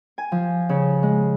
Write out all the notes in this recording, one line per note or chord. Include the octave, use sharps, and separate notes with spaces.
G#5
F3
C#3
G#3